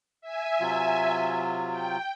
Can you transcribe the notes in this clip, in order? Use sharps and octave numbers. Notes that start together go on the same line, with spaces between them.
E5 G#5
C3 F#3 F4
G5